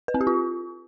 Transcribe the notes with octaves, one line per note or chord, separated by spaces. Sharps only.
B4
C4
G4
F4